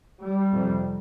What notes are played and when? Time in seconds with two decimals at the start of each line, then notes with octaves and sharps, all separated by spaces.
0.22 G3
0.51 F2 C3